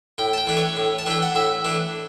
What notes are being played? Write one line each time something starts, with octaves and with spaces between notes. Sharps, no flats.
A2 G5
A5
G5
E3 A3 D4
C#5
A2
A5
E3 A3 D4 G5
F#5
A2 E5
E3 A3 D4